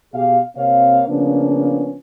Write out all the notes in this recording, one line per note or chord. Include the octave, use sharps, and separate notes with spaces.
B2 G4 G#4 F5
C3 A#3 C4 C#5 F5
C#3 F3 A#3 B3 C#4 D4